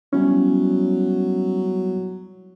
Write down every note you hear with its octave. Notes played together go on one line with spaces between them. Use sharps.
F#3 G3 B3 C#4 E4